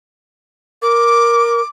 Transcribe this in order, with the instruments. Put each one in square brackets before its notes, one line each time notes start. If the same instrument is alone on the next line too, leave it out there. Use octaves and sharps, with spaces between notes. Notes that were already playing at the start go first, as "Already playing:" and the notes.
[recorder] A#4 [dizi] D6